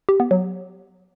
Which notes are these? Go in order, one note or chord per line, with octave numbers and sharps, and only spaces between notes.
G4
B3
F#3